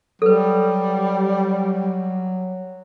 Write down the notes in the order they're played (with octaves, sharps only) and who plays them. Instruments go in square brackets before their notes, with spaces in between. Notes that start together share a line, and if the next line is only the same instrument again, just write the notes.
[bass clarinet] F#3 [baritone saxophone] G3 [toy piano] A4 B4